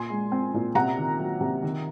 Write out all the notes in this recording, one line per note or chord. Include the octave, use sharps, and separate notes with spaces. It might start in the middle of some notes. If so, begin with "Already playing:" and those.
Already playing: A#2 G#5 C6
G#3
C4
A#2
C3 F#5 A#5
D#3
F#3
C3
D#3